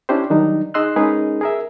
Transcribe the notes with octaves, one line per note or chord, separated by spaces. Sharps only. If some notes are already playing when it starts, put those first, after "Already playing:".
C#4 D4 E4 G4 C5
D#3 F#3 G3 D4 D#4
D#4 G#4 D#5 C6 E6 F#6
G#3 C#4 D#4 G#4 A#4 B4
G#4 A#4 E5